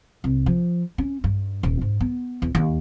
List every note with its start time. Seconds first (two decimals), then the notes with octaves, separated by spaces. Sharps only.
0.24 C2
0.46 F3
0.98 C#4
1.24 G2
1.63 D#1
1.81 G#2
2.01 B3
2.42 E2
2.55 D#2